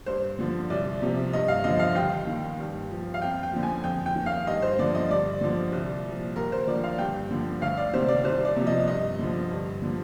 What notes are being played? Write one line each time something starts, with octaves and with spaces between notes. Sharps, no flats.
G2 C5
D3 F3
C2 D5
C3 F3
G2 D#5
F5
D3 F3 D#5
F5
D#2 G5
D#3
G2
F3
F5
F2 G5
G5
D3 F3
G#5
F2 G5
G5
D#3
F5
G2 D#5
C5
D3 F3 D5
D#5
G2 D5
D3 F3
C2
A#2 F3
D#2 A#4
C5
D3 F3 D5
F5
G2 G5
D3 F3
D2 F5
D5
C3 D#3 C5
D5
C2 C5
D5
C3 F3
D#5
G2 D#5
D3 F3
G2
D3 F3